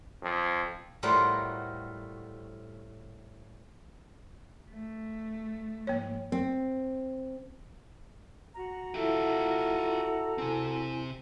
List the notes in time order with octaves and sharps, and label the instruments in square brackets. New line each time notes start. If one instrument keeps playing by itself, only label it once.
[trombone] F2
[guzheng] A2 G3 F4 F#4 A#4 C5
[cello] A3
[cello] G#2 F3 [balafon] A#3 C#5
[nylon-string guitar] C4
[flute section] F#4 A#5
[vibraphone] E4 E5 F#5 [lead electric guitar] F4 G4 [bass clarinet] A4
[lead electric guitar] C3 C4 [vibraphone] E4 G#5